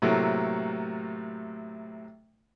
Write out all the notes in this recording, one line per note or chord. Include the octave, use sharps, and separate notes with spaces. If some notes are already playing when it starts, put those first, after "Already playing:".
A2 C3 F#3 A3 A#3